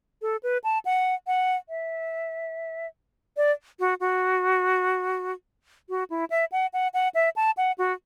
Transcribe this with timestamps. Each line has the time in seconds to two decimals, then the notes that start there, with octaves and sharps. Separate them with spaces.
0.22 A4
0.43 B4
0.64 A5
0.85 F#5
1.27 F#5
1.69 E5
3.37 D5
3.80 F#4
4.00 F#4
5.89 F#4
6.10 E4
6.30 E5
6.52 F#5
6.73 F#5
6.94 F#5
7.15 E5
7.36 A5
7.57 F#5
7.78 F#4